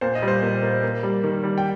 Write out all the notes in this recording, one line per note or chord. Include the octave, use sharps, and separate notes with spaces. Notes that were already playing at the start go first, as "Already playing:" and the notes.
A#2 C5
D#5
G3
C5
A#2
A#3
A#3
G3
D#3
G3
G5